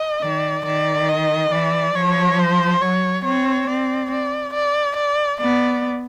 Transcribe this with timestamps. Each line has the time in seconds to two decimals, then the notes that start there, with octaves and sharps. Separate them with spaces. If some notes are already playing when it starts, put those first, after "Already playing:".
Already playing: D#5
0.22 D#3 D5
0.65 D#3 D5
1.09 D#5
1.52 E3 D5
1.95 F3 C#5
2.39 C5
2.81 F#3 C#5
3.25 C4 C#5
3.67 C4 D5
4.11 D5
4.54 D5
4.97 D5
5.41 B3 D5